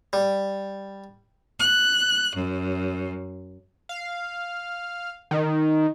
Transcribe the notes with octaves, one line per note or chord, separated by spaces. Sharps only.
G3
F#6
F#2
F5
D#3